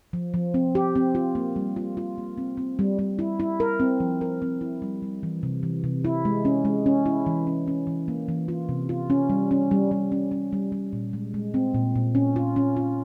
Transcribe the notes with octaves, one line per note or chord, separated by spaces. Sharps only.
F3
F3
C4
G4
C4
F4
A#3
G3
F4
F4
A#3
C4
C4
G3
G3
E4
E4
A#4
C4
F3
A#4
C4
E4
G3
G3
E3
C3
E3
C3
E4
G#3
C#4
G#3
C#4
E4
E3
C#4
C#4
E3
A#3
E3
F4
C3
F4
C#4
G3
C#4
G3
G3
C#4
C#4
G3
G3
A#2
G#3
G#3
C4
A#2
A#2
C#4
F4
C#4
F4